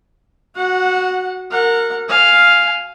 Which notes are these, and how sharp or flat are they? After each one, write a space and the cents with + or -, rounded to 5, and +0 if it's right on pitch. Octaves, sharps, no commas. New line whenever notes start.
F#4 +0 F#5 -20
A#4 -15 F#5 -25
F5 +0 G#5 +0